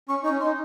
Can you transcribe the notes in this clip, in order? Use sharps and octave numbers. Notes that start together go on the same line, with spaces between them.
C#4 C#6
D#4 C#6
C#4
C6
D#4